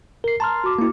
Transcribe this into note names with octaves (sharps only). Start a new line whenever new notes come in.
A#4 C7
A5 A#5 C6 F6
F#4 D6
A#3 E4